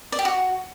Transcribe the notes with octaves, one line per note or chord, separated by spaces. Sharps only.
D5
G4
F#4